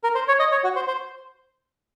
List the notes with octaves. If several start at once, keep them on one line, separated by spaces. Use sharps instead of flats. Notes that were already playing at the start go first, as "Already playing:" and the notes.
A#4
C5
C#5
D#5
C#5
F#4
C5
C5